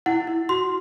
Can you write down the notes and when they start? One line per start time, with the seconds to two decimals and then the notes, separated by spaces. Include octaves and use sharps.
0.06 E4 F#5
0.27 E4
0.49 F#4 C6